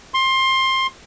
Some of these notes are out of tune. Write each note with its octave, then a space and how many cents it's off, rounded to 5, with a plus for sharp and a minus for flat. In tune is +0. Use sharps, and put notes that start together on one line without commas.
C6 +20